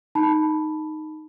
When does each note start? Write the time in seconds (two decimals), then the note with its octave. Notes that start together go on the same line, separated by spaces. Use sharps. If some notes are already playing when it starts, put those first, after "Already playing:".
0.15 D#4 A5 B5